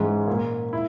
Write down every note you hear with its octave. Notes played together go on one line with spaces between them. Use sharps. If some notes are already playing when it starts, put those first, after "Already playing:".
Already playing: G#2 E3 G#3 C#4
A#2 A#3
E4